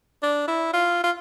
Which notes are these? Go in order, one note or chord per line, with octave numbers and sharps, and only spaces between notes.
D4
E4
F4
F4